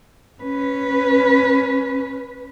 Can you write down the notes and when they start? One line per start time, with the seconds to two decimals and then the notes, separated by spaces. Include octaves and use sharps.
0.42 C#4 B4